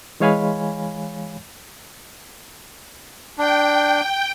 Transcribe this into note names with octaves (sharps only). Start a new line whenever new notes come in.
E3 G#3 C#5 F5 G#5 B5
D4 G5